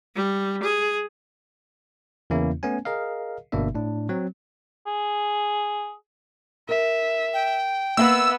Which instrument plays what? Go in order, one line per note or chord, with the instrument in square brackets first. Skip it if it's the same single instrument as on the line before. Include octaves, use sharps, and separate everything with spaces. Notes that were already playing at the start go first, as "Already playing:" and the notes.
[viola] G3
G#4
[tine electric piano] E2 C#3 E3 A#3 C#4 E4
A3 B3 C#4 G#5
G#4 A#4 D#5 F5
G1 B2 A#3 D4 E5
A2 D4
F#3 C4
[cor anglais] G#4
[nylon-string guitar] A#4 [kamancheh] E5
[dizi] G5
[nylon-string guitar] A#3 E5 F5 [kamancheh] B3 [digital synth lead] E6